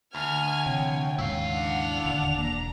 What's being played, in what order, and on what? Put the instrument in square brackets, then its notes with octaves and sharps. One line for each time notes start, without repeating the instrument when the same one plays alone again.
[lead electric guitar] D2 [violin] G#5 [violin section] F6
[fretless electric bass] C3 D#3 E3 [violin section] C#5 G5
[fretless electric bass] D#2 G#2 C#3 [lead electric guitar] E4 F5
[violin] D4 F7 [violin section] F#5
[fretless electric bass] E1 D#2 D3
[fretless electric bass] E1 A#3 [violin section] A#5